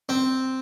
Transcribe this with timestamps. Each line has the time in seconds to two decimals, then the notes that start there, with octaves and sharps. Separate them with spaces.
0.09 C4